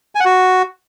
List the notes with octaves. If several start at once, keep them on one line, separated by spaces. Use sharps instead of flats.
G#5
F#5
F#4